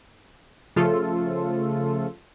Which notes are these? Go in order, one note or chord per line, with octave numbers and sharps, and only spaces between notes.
C#3 F3 A3 F4 A4